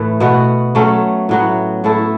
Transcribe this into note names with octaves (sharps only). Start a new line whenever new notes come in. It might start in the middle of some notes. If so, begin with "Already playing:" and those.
Already playing: A2 E3 A3
B2 B3 F#4
F#3 A3 C#4
A2 F#3 B3 F#4
A2 A3 E4 A4